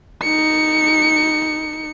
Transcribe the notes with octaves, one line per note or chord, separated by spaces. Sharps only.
D#4 C#7